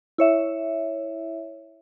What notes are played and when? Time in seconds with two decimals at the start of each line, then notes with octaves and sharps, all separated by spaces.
0.18 E4 C#5 E5